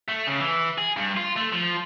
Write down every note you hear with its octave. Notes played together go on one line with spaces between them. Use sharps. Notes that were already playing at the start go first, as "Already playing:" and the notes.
A3
C#3
E3
G#4
G2
F4
A3
F3